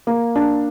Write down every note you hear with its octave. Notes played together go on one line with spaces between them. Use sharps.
A#3
D4